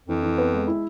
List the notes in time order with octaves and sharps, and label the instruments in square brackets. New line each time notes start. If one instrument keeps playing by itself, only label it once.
[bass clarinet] F2 [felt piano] E3
[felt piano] E3
B3
G#3
E4